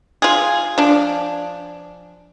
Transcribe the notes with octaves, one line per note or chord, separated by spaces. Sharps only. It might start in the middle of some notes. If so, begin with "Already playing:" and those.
F4 G#4
F3 D4